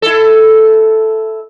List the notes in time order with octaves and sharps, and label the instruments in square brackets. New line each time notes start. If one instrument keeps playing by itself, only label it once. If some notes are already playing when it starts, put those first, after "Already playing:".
[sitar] E4 A4